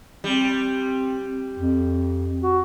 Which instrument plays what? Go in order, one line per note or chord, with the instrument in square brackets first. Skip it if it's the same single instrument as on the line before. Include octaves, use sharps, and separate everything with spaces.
[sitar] G3 [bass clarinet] C4
[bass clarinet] F2
F#4